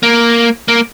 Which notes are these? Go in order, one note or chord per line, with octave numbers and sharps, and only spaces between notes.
A#3
A#3